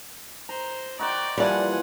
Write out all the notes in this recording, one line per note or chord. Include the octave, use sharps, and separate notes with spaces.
C5 A#5
D#4 F#4 C5 D5 G5
A#2 E3 F3 G3 D5 F#5 G#5